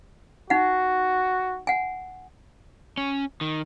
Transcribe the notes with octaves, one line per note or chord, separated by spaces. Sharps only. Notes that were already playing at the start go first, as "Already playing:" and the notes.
D#4 F#4 F#5
F#5 G#5
C#4
D#3